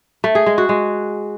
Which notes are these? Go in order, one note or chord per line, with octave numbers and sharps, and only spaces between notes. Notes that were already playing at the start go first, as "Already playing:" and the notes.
A3
G#4
G#3
F#4
G#3